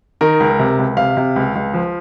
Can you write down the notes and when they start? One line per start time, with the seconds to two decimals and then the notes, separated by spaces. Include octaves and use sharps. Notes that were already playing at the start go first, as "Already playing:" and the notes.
0.21 D#3 A#4
0.40 C#2
0.59 C3
0.78 C#2
0.97 C3 F5
1.17 C3
1.36 C#2
1.55 C#2
1.74 F3